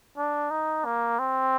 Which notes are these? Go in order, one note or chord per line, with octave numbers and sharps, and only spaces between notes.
D4
D#4
A#3
C4